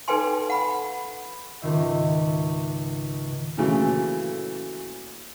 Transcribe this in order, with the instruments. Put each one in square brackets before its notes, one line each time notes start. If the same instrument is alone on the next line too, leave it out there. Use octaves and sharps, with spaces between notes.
[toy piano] D#4 A4 B4 G5 G#5 C6
F#5 B5
[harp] C#2 G#2 D#3 E5
[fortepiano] A#2 C#3 E3 F#3 A3